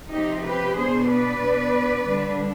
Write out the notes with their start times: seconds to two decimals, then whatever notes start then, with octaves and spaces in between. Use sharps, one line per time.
0.11 C3 F3 C4 D#4 G4
0.44 G4 B4
0.75 B2 B3 D4 G#4 C5
1.08 B4 D5
1.40 B2 B3 D4
2.05 D3 G3 D4